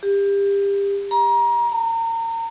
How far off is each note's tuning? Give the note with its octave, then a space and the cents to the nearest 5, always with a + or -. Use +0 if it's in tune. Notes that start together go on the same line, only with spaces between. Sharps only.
G4 +30
A#5 +30
A#5 -35